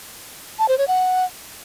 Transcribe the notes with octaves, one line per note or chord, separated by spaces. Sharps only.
A5
C5
C#5
F#5